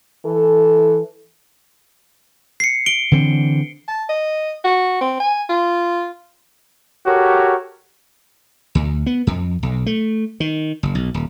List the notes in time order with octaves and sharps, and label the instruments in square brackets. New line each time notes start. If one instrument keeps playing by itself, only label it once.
[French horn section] E3 A4
[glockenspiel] C7 C#7
D7 G7
[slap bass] D3 E3 C4
[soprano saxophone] A5
D#5
F#4
C4
G#5
F4
[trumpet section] F#4 G4 A4 A#4 C#5
[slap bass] D2
B3
F2
B1
A3
D#3
F#1
B1
D#1